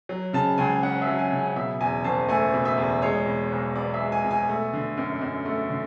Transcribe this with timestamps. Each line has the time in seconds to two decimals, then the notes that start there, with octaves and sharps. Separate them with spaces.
0.09 F#3
0.33 C#3 A5
0.58 C#2 G#5
0.83 C#4 F#5
1.02 E5
1.07 F#3
1.19 G#5
1.32 C#3
1.38 G#5
1.56 B2 E5
1.80 E2 G#5
2.04 F#1 A5
2.29 A3 G#5
2.54 B2
2.65 E5
2.78 E2
3.02 G#3 C#5
3.26 B2
3.52 B1
3.75 B3 D5
3.94 E5
4.00 G#3
4.12 G#5
4.25 B2
4.31 G#5
4.49 A3
4.73 D3
4.97 F#2
5.22 F#2
5.46 A3
5.70 D3